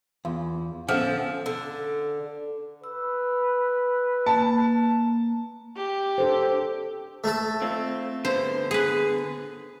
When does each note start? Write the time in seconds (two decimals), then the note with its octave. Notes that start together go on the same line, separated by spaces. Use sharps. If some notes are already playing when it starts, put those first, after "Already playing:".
0.25 E2 F4
0.89 D3 F3 B3 C#4 A4 E5
1.46 D3
2.84 B4 E6
4.26 A#3 A5
5.76 G4
6.18 D4 A4 C5
7.24 A3 A4
7.62 C4 F4
8.25 D3 B3 C5
8.71 G#4 B4